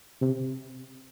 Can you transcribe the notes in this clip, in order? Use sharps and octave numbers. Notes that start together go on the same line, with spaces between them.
C3